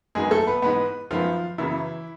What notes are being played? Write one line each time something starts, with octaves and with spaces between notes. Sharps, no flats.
F#2 D#3 F#3 G#3 B3 G#4
A3 A4
B3 B4
G#2 E3 G#3 B3 B4
F#2 D#3 F3 G#3 B3 F4
F#2 C#3 E3 F#3 B3 E4